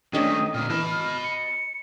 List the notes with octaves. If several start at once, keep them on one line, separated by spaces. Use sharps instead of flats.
D#3 G#3 A3 C#4 D4 D#5 G5
A#2 D3 F6
E3 D#5 A5 B5
C#7